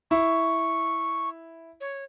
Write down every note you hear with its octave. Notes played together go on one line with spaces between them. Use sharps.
E4 C#6
C#5